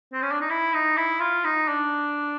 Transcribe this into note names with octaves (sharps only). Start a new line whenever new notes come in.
C4
C#4
D4
D#4
E4
D#4
E4
F4
D#4
D4